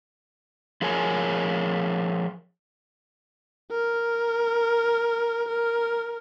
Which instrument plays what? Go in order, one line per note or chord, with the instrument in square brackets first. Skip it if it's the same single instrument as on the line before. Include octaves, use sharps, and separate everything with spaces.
[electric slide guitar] F3 G#4 A#4 C#5 G#5
[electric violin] A#4
A#4